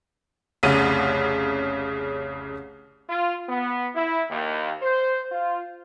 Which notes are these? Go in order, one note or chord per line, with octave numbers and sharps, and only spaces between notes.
F1 C2 C#3 D#7
F4
B3
E4
D#2
C5
F4